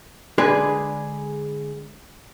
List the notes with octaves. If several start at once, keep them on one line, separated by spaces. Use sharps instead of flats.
D3 G#3 D4 G#4 B4